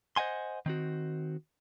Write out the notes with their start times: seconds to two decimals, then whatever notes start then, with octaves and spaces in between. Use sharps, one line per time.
0.16 C5 D#5 F#5 G#5 C6
0.66 D#3 C4 F#4